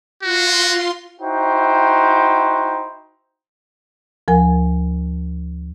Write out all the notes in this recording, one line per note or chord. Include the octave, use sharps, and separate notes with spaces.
F4 F#4 C6
D#4 E4 F#4 C5 G5
D2 F3 A#4 G#5